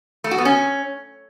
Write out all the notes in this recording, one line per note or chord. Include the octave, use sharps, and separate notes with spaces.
A3
F#4
B3
C#4